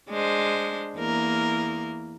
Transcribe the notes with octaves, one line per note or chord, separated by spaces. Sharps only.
G#3 D4 C5
E2 A#3 A#4